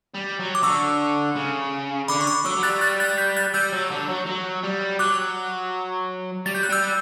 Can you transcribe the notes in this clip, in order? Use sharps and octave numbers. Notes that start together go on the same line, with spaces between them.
G3
F#3
D6
D3 C#6 E6
C#3
D3 B5 D6
C#6
B5 D6
F#3 C#6 E6
F#3
G3 F#6 A6
F#6 A6
F#6 A6
G6 B6
F#6 A6
G3 E6 G6
F#3
D3
F#3
F#3
G3
F#3 D6 F#6
G3 A6
G6
F#6
G3 E6 G6